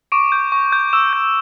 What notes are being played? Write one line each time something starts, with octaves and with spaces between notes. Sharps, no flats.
C#6 D6 D7
G6
C#6
G6
C#6 E6 E7
G6